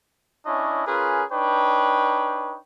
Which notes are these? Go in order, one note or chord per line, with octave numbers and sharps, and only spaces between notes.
C#4 D4 E4 C#5 D#5
C#4 F4 G#4 A#4 B4
D4 D#4 B4 C#5 G5